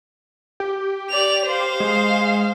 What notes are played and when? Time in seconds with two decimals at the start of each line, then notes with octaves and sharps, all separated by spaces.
0.60 G4
1.10 D5 F7
1.46 C5 F5
1.80 G#3